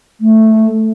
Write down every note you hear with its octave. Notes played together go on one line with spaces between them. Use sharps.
A3